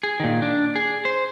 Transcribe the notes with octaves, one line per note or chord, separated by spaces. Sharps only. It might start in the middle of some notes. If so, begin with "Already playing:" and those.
G#4
A#2 D#3
D4
G#4
C5